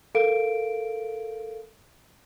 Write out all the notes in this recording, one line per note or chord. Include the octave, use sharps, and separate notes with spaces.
A4 A#4 F5 D7